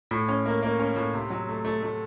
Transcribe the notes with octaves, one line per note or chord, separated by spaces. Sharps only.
A2
C#4
A#3
A#3
C#4
A2
C3
F#3
A3
A3
A3